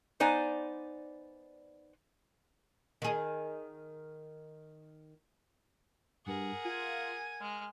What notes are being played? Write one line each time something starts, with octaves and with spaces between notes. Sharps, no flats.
B3 D#4 C5 D5 G#5
D#3 G#4
G2 G#4 A#4 F#5
F4 G#5
G#3 F6